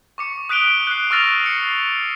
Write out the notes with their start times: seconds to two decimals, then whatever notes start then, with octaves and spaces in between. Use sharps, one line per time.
0.18 C#6 D6 C#7
0.49 D#6 F#6 B6 D7 F7 G7
0.87 F#6 C7
1.11 C#6 E6 F6 A6 A#6 F7
1.46 C7 C#7